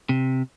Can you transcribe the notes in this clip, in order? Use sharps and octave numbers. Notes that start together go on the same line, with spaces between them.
C3